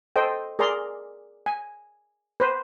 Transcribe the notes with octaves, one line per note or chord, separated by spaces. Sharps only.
A4 C5 D#5 G5
G#4 A#4 D5 A#5 C6
G#5
B4 C5